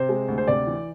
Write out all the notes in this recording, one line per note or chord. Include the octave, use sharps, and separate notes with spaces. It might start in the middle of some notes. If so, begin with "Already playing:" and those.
Already playing: C3 C5
G#3
D2
C5
C3 D5
E3